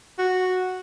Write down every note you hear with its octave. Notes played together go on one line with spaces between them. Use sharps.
F#4